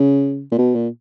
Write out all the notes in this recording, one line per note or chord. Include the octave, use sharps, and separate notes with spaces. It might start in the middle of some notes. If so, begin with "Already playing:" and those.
Already playing: C#3
A#2
B2
A#2